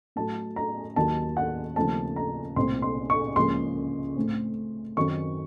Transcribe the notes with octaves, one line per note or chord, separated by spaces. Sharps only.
A2 F#3 A3 A5
A#5
D#2 D#3 F#3 A5
F#5
D#2 C#3 F3 A3 C4 A5
A#5
C2 A#2 A3 C4 C6
C6
C#6
C#2 C#3 F3 A#3 C6
A2 A3 C4
F#2 D#3 F#3 C4 C#6